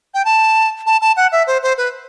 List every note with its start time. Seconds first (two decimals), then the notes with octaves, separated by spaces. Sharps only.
0.14 G5
0.25 A5
0.86 A5
1.01 A5
1.16 F#5
1.32 E5
1.47 C5
1.62 C5
1.78 B4